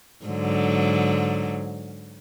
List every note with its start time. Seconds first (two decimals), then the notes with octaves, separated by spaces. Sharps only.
0.25 G#2 D3 F#3